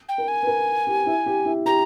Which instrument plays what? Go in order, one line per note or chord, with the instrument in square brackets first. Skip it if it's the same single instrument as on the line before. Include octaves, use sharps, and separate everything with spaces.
[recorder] G5
[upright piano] A#4
[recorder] G#5
[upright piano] B4
A#4
G4
E4
G4
E4
[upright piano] G4 [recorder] A#5